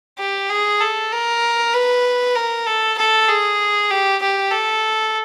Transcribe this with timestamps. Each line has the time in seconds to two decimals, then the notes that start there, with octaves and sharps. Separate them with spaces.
0.18 G4
0.50 G#4
0.80 A4
1.12 A#4
1.73 B4
2.35 A#4
2.66 A4
2.98 A4
3.28 G#4
3.90 G4
4.21 G4
4.51 A4